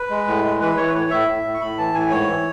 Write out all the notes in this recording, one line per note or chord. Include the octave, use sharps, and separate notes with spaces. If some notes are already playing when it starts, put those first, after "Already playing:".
Already playing: B4
G#3
A2
G#3
E3 B4
E3 C#5
B4
A2 C#5
A2 E5
A2
A2
C#6
A2 B5
E3 A5
A2 G#5
G#2 C#5
E3